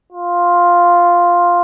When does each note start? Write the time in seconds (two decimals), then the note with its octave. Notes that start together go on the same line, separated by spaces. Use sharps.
0.12 F4